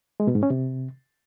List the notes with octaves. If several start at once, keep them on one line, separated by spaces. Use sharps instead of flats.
G#3
B2
G#2
C#4
C3